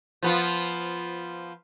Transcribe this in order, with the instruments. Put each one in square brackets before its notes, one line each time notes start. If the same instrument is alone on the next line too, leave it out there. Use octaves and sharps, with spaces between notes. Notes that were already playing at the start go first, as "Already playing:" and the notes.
[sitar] F3 B3 F4